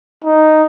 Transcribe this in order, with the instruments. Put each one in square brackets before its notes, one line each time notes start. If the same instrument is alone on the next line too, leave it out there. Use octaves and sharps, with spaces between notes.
[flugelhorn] D#4